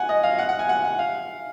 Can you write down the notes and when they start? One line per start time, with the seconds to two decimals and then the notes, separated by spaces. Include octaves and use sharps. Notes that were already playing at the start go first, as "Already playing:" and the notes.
Already playing: F#5 G#5
0.09 D#5
0.23 F5
0.38 F#5
0.49 F#5
0.59 G#5
0.69 F#5
0.84 F#5
0.99 F5